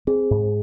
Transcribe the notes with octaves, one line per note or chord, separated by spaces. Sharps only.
C4 G#4
G#2